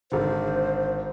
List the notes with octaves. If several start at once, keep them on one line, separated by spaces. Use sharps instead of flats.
G#1 D3 C5